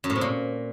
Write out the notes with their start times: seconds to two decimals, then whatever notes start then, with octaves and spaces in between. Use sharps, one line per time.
0.04 F#2
0.10 A2
0.16 C3
0.21 A#2